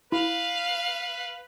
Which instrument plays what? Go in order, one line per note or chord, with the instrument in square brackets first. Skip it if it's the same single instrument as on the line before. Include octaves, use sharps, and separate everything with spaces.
[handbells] E4 [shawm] B4 [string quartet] F5